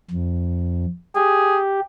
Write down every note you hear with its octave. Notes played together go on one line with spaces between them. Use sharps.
F2
G4 G#4